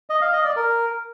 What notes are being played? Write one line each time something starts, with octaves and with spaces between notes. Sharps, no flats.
D#5
F5
D#5
D5
A#4